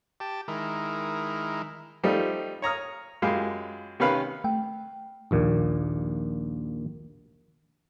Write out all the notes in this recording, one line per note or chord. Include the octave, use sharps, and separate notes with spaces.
G4 A5
D#3 G#3 E4 A#4
F3 G3 A3 C4 D#4
C#5 A#5 D#6 F6
F#2 G#3 F4 G4 F5 B5
C3 D#3 C#4 B4 F5 B5
A3 G5
A#1 D#2 A#2